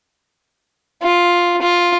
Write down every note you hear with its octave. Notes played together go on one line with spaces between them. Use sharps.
F4
F4